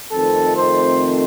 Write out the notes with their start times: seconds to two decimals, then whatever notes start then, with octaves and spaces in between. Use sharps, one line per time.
0.11 F2 D#3 A3 C4 A4
0.57 C5